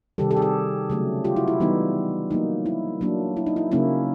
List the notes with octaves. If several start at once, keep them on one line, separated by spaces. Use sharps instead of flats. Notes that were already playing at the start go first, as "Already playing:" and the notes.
C3 D#3 G3 G4 A4
G4 A4
G#4
G4 A4
C#3 F#3 A3
F4 G4
E4 F#4
E4
E3 G3 B3 D#4
F#3 A#3 D#4
E4
F#3 A#3 D4
E4
D#4
E4
C#3 F#3 A#3 C#4 E4